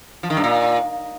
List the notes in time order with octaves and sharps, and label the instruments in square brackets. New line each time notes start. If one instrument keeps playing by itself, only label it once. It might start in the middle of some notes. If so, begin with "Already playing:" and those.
[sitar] F3
D#3
G2
A#2